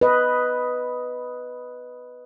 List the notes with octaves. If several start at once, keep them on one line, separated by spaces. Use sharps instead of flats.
B4 D#5